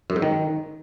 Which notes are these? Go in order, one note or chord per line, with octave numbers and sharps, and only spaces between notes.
F#2
G#2
D#3